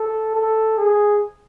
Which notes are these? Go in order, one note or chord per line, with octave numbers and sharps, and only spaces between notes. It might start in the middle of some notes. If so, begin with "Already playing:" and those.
Already playing: A4
A4
G#4